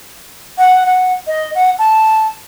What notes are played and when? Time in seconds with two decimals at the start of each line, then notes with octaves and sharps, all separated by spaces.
0.58 F#5
0.86 F#5
1.27 D#5
1.55 F#5
1.79 A5